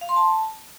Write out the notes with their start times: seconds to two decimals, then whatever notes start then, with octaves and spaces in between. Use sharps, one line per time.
0.01 F5
0.09 C6
0.16 A5